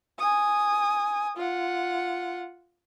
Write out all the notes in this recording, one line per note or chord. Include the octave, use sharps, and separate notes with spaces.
G#5 D#6
F4 F#5